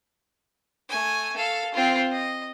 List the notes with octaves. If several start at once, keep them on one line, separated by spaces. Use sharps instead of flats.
A3 G#5
A4 F5
C4 F4
D#5